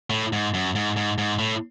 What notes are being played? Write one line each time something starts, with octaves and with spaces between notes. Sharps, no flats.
A2
G#2
F#2
G#2
G#2
G#2
A2